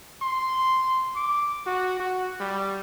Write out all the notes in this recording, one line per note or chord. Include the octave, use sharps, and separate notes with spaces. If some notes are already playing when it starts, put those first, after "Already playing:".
C6
D6
F#4
F#4
G3